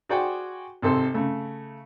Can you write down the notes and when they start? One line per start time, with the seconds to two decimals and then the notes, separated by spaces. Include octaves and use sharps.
0.09 F#4 G#4 C5 D5 F#5 G5
0.82 G#1 C3 A4 C5
1.14 C#3 A3